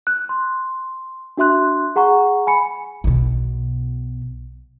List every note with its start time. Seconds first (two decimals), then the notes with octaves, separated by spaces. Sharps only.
0.07 F#6
0.29 C6
1.37 D4 F#4 E5 C6 F#6
1.96 G#4 F#5 A#5 C#6
2.47 G#5 B5 C#7
3.04 B1 B2